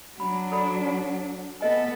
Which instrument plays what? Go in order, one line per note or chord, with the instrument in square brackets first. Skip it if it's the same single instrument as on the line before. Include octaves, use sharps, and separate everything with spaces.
[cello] F#3 D4 [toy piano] B5
[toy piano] A4 D5 B5
[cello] B3 A4 [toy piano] D#5 G#5